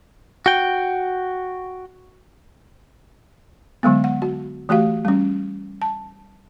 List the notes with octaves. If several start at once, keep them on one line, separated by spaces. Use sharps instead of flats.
F#4 G5
D3 F#3 G#3 B3
F#5
F#4
E3 A3 F#4 G4 F5
G3 C#4
A5